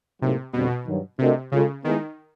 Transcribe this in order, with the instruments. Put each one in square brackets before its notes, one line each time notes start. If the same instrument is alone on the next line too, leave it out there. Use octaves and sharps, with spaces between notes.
[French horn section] A2 F#3 A#3 D#4 G4 [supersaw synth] C3
[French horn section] F2 D3 G3 C4 [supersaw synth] B2
[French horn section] G2 D#3 F#3
[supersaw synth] C3 [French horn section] A3 D4 F#4 A#4 D#5
[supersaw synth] C#3 [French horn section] G#3 C#4 F4 A4
[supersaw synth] D#3 [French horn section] G#3 B3 E4 G#4